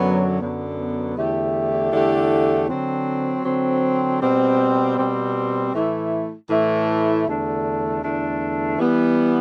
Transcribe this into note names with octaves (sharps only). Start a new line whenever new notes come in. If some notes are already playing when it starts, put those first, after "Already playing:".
Already playing: F#2 D3 F#3 B3
F#2 D3 F#3 B3
E2 D3 A3 E4 G4
E2 D3 A3 E4 G4
D3 F#3 C4
D3 F#3 C4
B2 G3 C4
B2 G3 C4
A2 E3 A3 E4
A2 E3 A3 E4
E2 D3 A3 D4 A4
E2 D3 A3 D4 A4
E3 G3 B3